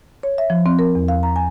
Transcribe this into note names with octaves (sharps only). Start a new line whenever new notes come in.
C#5
E5
F3
C4
A#4
E2
F5
A#5
G#5